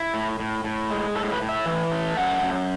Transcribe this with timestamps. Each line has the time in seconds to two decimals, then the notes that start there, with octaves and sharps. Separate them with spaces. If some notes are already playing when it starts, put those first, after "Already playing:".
Already playing: E4
0.14 A2
0.40 A2
0.64 A2
0.90 G#3
1.15 A2 A4
1.32 B4
1.42 A2
1.49 E5
1.66 E3
1.91 A3
2.17 F#2 F#5
2.42 F#2